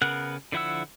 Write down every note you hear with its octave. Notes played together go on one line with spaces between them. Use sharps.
C#3 B3 A#4 F#5 F#6
D3 F3 E4 F#5 E6